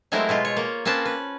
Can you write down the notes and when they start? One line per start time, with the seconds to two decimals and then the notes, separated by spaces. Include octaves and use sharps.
0.12 F#3 G#3 A3 C4 E4 A#4
0.29 B2 G#3 F4
0.45 C#5
0.57 A#3
0.85 A#3 C4 C#4 B4 A5
1.05 B4